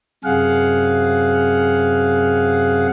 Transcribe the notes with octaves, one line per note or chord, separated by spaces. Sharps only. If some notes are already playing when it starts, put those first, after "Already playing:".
F#2 C3 G#4 F5 F#5